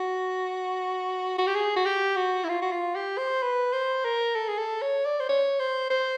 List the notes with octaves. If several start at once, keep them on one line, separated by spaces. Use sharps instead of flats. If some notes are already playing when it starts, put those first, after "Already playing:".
Already playing: F#4
F#4
G4
G#4
F#4
G4
F#4
E4
F4
F#4
F4
G4
C5
B4
C5
A#4
A4
G#4
A4
C#5
D5
C5
C#5
C5
C5